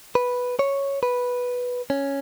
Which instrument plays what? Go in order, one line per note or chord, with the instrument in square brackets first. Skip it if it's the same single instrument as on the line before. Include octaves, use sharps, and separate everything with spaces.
[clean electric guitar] B4
C#5
B4
C#4